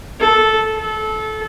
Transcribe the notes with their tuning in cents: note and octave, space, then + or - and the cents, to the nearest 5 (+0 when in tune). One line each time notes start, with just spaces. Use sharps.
A4 -10
A4 -20